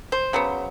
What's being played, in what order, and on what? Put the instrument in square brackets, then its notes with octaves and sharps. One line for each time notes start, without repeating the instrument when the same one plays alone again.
[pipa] C5
C#3 F#3 B3